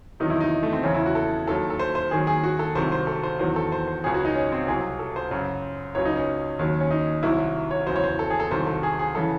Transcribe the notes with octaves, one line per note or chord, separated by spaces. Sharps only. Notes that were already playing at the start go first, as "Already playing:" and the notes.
E2 C3 D#3 F#3 D#4
E4
D#4
A3
C4
E2 C#3 E3 C#4
E4
F#4
A4
D#2 D#3 F#3 A4
A4
C5
C5
D#2 D#3 F#3 G#4
G#4
F#4
A4
C2 C3 D#3 F#3 C5
C5
A4
C5
E2 D#3 F#3 C5
A4
C5
C5
C#2 C#3 F#3 G#4
F#4
D#4
C#4
C4
C2 C3 F#3 G#4
A4
C5
F#2 C#3 F#3
C#2 C#3 F#3 C#5
D#4
C#4
D#2 D#3 F#3
C#4
D#4
C2 C3 D#3 F#3 E4
C#5
E2 C#3 F#3 C5
C#5
C5
A4
G#4
A4
C2 C3 D#3 F#3 C5
A4
G#4
G#4
C#3 E3 A4